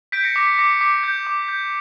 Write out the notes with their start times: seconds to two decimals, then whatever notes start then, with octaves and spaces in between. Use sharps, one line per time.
0.12 G6 B6 D7
0.24 A#6 C#7
0.36 D6 B6
0.47 B6
0.58 D6 A#6 C#7
0.81 D6 B6
1.04 G6
1.27 D6
1.48 G6